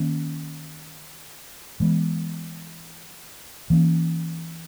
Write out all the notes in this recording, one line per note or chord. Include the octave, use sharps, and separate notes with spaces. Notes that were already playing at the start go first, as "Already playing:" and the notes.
Already playing: D#3 A#3 C#4
E3 G#3 B3
E3 A#3 C#4